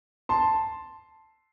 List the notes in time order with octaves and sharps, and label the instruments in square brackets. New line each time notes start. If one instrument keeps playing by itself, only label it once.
[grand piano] A5 C6